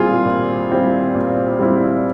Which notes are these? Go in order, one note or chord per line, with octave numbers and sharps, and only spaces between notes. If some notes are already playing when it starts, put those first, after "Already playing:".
Already playing: A#2 G3 C4 E4 F4 G#4
A#2
G3 C4 E4
A#2
G3 C4 E4